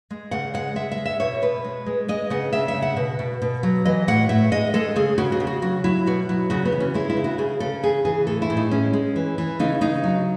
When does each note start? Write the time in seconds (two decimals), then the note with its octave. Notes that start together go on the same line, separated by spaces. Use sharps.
0.10 G#3
0.31 C#3 F#5
0.54 G#3 F#5
0.76 G#3 E5
0.92 E5
0.98 G#3
1.06 E5
1.20 B2 C#5
1.42 B2 B4
1.65 G#3
1.86 G#3
2.08 G#3 D#5
2.30 C#3 F#5
2.53 C#3 E5
2.68 E5
2.75 G#3
2.82 F#5
2.97 B2
3.19 B2
3.42 B2
3.63 F#3
3.85 E3 D#5
4.08 A2 F#5
4.29 A2 E5
4.52 G#3 D#5
4.74 G#3 A4
4.96 C#3 G#4
5.18 C#3 F#4
5.32 F#4
5.40 C#3
5.47 F#4
5.62 F#3 F#4
5.84 F#3 E4
6.06 B2 F#4
6.29 F#3 E4
6.50 C#3 F#4
6.65 B3
6.72 E3
6.80 C#4
6.94 G#3 E4
7.10 E4
7.17 C#3
7.24 F#4
7.38 C#3 G#4
7.60 C#3 A4
7.83 E3 G#4
8.05 E3 G#4
8.27 A2 A4
8.42 E4
8.50 A2
8.57 D#4
8.71 G#3 C#4
8.93 G#3
9.16 E3
9.38 E3
9.59 C#3 D#4
9.81 C#3 D#4
10.04 F#3